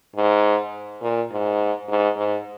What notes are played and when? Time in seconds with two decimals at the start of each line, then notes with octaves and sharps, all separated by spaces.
0.16 G#2
1.01 A#2
1.31 G#2
1.88 G#2
2.16 G#2